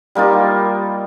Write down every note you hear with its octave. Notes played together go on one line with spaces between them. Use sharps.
G3 A#3 D#4 F4